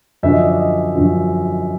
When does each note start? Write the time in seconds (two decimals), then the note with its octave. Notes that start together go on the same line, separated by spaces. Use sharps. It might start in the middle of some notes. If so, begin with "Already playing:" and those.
0.23 F#2 D3 F3 E5
0.32 D#5
0.41 D5
0.49 D#5
0.95 F#2 D3 F3